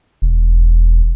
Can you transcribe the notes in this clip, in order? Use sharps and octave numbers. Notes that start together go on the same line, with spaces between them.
E1